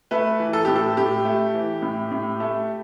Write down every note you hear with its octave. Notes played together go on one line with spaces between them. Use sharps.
A3 B4
E3
A4
A2 G4
A4
A2 G4
A3
E3
A2
A2
A3